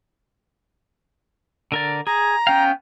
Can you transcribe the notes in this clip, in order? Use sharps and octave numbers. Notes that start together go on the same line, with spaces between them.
D3 A#4 D5
G#4 A#5
B3 C#4 F5 G5